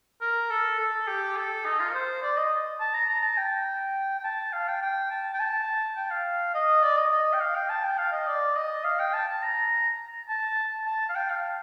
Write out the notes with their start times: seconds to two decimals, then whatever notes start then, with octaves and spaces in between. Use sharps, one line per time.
0.21 A#4
0.50 A4
0.79 A4
1.08 G4
1.37 A4
1.65 D#4
1.80 F4
1.89 A#4
1.94 C5
2.23 D5
2.37 D#5
2.80 A5
2.94 A#5
3.09 A#5
3.23 A5
3.38 G5
4.19 G5
4.24 A5
4.52 F5
4.68 G5
4.82 G5
5.11 A5
5.34 G5
5.40 A5
5.97 G5
6.11 F5
6.54 D#5
6.83 D5
6.97 D#5
7.12 D#5
7.33 G5
7.40 F5
7.55 G5
7.69 A5
7.84 G5
7.98 F5
8.12 D#5
8.27 D5
8.56 D#5
8.84 F5
9.00 G5
9.14 A5
9.28 A5
9.42 A#5
10.29 A5
10.86 A5
11.09 F5
11.15 G5
11.30 F5